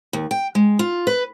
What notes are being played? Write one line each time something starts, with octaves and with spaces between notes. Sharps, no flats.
D#2
G5
G#3
F4
B4